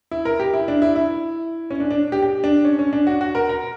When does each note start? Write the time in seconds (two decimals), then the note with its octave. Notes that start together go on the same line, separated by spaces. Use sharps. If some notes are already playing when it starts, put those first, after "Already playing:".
0.11 E4
0.25 A#4
0.40 G4
0.53 E4
0.68 D4
0.82 E4
0.96 E4
1.71 C#4
1.80 D4
1.91 D4
2.12 G4
2.22 G4
2.44 D4
2.65 C#4
2.79 C#4
2.93 D4
3.07 F#4
3.21 F#4
3.35 A#4
3.49 A#4